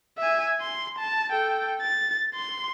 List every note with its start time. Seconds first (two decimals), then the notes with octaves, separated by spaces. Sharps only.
0.18 E5 G#5
0.61 C6
0.99 A5
1.31 A4 G5
1.81 A6
2.34 C6